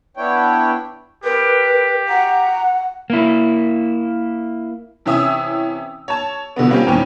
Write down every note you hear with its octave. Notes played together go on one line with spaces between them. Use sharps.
B3 D4 E4 C#5 G5
G4 A#4 B4
F#5 A#5
A#3 E4
C3 E3 C#4 E5 D#6 E6
C#5 A5
B2 D3 F3 B3
G3 A#3 C4 C#4 F4 G4
E2 G2 A#2 D#3 C4 C#4